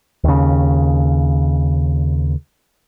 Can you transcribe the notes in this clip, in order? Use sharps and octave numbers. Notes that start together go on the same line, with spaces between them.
D#2 C#3